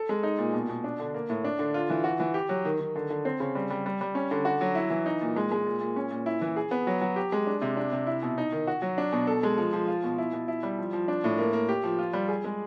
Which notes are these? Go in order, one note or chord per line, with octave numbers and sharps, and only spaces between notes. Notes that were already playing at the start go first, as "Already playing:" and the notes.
Already playing: A4
G#3
D#4
A#2
B2
B2
D4
D3
A#3
A2
D4
D3
F4
E3
F#4
E3
G4
F#3
D#3
D#3
D3
D3
C4
C#3
G3
G3
G3
G3
C#4
D3
F#4
F#3
E4
E3
D#4
A#2
G#3
G#3
A#2
A#2
C#4
A#2
E4
E3
G#4
B3
F#3
F#3
G4
G#3
D4
C3
D4
C3
E4
B2
D#4
D#3
F#4
F#3
D4
B2
A4
G#3
F3
F3
F4
B2
E4
B2
E4
G3
F3
F3
D4
A2
A#3
A#3
G4
F3
F4
G3
G#4
G#3